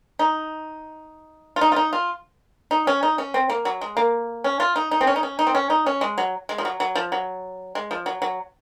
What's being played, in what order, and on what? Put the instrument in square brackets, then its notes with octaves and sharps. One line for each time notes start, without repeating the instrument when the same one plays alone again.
[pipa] D#4
F4
D#4
F4
D#4
F4
D#4
C#4
D#4
C#4
C4
A#3
F#3
G#3
A#3
C#4
F4
D#4
D#4
C4
C#4
D#4
C#4
D#4
C4
C#4
D#4
C#4
G#3
F#3
G#3
F3
F#3
F#3
F3
F#3
G#3
F3
F#3
F#3